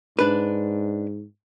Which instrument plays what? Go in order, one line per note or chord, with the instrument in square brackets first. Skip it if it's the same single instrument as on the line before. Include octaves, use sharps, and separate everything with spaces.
[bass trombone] G#2 [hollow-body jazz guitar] D4 B4